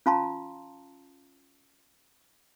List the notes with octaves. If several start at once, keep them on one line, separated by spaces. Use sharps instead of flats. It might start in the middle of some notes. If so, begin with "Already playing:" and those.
C#4 F4 F5 A5 A#5 C6